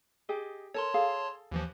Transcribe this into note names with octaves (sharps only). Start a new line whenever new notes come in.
G4 G#4 D#5
A4 A#4 C#5 A5 C6
G#4 A4 F5
D#2 E3 F3